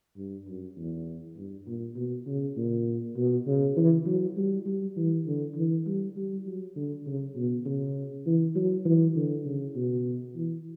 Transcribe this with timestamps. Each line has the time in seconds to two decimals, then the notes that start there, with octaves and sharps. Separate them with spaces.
0.17 G2
0.47 F#2
0.76 E2
1.37 G2
1.67 A#2
1.96 B2
2.27 C#3
2.57 A#2
3.16 B2
3.47 C#3
3.76 E3
4.06 F#3
4.37 G3
4.66 G3
4.97 E3
5.26 D3
5.56 E3
5.86 G3
6.16 G3
6.46 F#3
6.76 D3
7.06 C#3
7.35 B2
7.65 C#3
8.26 E3
8.55 F#3
8.85 E3
9.16 D3
9.45 C#3
9.76 B2
10.36 E3